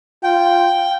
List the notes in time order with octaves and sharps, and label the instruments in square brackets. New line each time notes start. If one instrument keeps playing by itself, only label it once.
[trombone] F4 [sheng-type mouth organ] G5